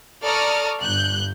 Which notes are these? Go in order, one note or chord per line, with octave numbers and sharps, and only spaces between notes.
A4 D5 A#5 C#6 D#6 F6
G1 G2 F#6 G6